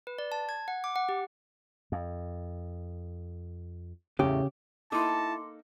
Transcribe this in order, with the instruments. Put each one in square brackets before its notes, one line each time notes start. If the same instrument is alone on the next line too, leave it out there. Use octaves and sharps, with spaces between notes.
[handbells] B4
D5
A5
G#6
F#5
D6
F#5
G4
[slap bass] F2
[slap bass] E2 A2 [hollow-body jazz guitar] C#3 G4
[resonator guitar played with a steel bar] A#3 D#4 A4 [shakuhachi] E4 [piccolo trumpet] A5 [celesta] C6 D6